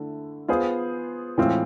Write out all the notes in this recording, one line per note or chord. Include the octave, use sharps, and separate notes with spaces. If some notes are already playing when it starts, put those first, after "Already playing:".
Already playing: D3 A3 E4
B3 F4 G#4 C5
A2 E3 G#3 C4 F4